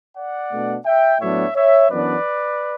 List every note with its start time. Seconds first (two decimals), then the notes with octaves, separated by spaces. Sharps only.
0.17 D5 F#5
0.52 B2 A3 D4
0.86 E5 G5
1.21 A2 F#3 B3 D4 C#5 E5
1.56 C#5 E5
1.91 F#2 E3 B3 D4 B4 D5